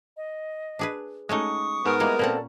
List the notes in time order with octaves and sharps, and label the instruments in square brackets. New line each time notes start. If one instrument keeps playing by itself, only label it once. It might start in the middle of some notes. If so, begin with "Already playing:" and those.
[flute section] D#5
[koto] D4 G#4 B4
[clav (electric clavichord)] G#3 D#4 [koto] A3 C#4 F#4 [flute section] C#6 D#6
[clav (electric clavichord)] G#2 [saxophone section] B3 A#4
[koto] G3 G#3 A#3 [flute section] E4 D#5
[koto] A#2 C#4 F#5 [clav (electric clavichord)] A#3 C4 [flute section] A4 D5 A5